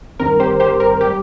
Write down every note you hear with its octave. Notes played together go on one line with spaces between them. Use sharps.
G1 G2 D#3 C4 A#4
G4 C5
G4 C5
A#4
G3 G4